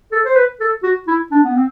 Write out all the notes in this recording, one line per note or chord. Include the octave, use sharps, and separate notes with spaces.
A4
C5
B4
A4
F#4
E4
D4
B3
C4